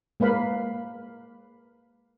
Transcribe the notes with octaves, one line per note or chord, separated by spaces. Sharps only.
G#3 A#3 B4 F5 B5